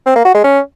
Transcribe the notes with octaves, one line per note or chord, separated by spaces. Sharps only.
C4
A#3
F#4
G#3
C#4